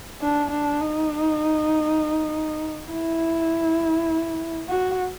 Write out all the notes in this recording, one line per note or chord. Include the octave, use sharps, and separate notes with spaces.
D4
D4
D#4
E4
F#4